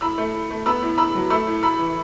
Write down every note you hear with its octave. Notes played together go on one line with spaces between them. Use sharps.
A2 B5 E6
A3
A2
A3
B3 B5 E6
A2
A2 B5 E6
F#3
A3 B5 E6
A2
A2 B5 E6
E3